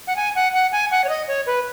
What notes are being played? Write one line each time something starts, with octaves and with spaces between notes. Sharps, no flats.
F#5
G#5
F#5
F#5
G#5
F#5
C#5
D#5
C#5
B4